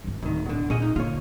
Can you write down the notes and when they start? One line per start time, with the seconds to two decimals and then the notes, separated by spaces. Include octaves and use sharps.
0.04 D#1 G#1
0.23 D1 C2 D#3
0.46 B2 D3
0.70 A#2 C#4 G#4 D#5
0.82 D#4
0.96 D3 A#3 F4 C#5